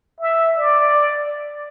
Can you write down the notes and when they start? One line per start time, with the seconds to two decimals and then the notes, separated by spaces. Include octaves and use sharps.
0.20 E5
0.58 D5